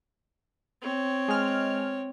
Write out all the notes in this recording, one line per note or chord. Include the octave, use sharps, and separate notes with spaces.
C4 C#5
G#3 F6